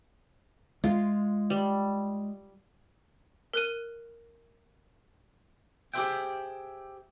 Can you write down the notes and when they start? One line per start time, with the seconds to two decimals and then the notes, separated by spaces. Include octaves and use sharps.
0.84 G#3 F4
1.50 G3
3.54 A#4 F#6 D#7
5.94 G4 G#4 B4 C5 E5 G5